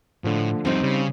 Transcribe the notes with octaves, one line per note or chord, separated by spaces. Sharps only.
A2 D3 F3
F2 G3 C4 D#4
C#3 G3